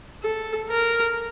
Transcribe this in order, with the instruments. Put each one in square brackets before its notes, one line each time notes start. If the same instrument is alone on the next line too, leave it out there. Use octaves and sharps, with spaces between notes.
[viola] A4
A#4